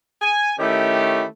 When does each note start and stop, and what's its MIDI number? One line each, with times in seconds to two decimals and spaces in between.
0.22 0.53 80
0.59 1.24 51
0.59 1.24 57
0.59 1.24 61
0.59 1.24 64
0.59 1.24 67